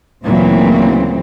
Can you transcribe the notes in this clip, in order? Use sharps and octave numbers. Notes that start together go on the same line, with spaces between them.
D2 A#2 C#3 E3 F#3 C4